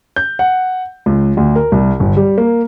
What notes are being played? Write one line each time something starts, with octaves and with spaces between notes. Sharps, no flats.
G6
F#5
C#2
D2
A#4
C2
G1
G3
A#3